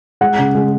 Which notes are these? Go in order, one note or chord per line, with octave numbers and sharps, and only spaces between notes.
G#3 F#5
C#3
G#3